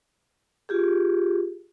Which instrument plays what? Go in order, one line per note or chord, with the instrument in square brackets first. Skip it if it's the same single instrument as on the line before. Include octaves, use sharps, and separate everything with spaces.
[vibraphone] F4 G4 G#4